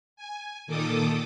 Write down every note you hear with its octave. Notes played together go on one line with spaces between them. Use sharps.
G#5
A#2 D#3 A4 D6 D#6